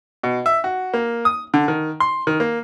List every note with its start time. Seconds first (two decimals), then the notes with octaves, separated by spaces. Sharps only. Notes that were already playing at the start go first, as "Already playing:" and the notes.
0.23 B2
0.46 E5
0.64 F#4
0.94 A#3
1.25 D#6
1.54 D3
1.68 D#3
2.00 C6
2.27 D#3
2.40 A#3